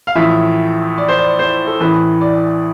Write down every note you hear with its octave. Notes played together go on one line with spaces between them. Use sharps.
F5
A1 A2 F3 E5
D5
C5
D5
C5
A4
A1 A2 E3 B4
D5